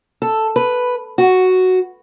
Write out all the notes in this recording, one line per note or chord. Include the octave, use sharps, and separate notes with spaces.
A4
B4
F#4